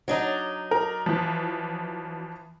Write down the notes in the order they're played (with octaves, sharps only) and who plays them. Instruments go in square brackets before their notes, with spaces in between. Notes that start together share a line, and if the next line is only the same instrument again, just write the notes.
[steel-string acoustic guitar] F#3 D4 D#4
[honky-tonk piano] A#4
E3 F3